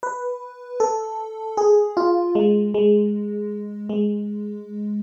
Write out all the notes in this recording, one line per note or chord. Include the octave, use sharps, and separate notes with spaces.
B4
A4
G#4
F4
G#3
G#3
G#3